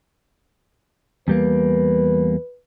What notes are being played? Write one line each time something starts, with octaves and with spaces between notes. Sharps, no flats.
E2 G3 A#3 B4